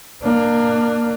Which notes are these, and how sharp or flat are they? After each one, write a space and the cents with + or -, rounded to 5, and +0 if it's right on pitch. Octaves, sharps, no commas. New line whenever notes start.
A#3 +0 D4 +25